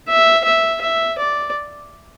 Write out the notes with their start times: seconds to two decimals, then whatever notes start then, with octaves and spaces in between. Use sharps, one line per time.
0.09 E5
0.45 E5
0.82 E5
1.19 D5